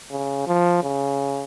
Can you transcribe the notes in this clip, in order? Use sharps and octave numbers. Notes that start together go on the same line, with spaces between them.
C#3
F3
C#3